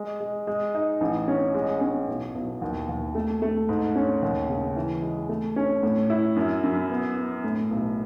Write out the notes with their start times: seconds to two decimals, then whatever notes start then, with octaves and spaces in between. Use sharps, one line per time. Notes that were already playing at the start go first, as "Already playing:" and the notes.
Already playing: G#3
0.20 G#3
0.47 G#3
0.74 D#4
1.01 A1
1.28 C#4
1.54 G#3
1.81 C#4
2.08 B1
2.35 B1
2.62 D#2
2.89 D#2
3.15 A3
3.42 A3
3.69 G#2
3.96 C#4
4.22 D#2
4.49 C#3
4.76 E3
5.02 G#3
5.29 A3
5.56 C#4
5.83 A2
6.10 E4
6.36 F#2
6.64 F#2
6.90 B3
7.17 B3
7.44 A2
7.71 B1